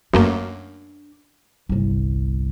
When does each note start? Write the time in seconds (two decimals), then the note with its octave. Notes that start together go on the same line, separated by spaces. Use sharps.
0.14 F#2 A3 A#3 D4
1.69 G1 C2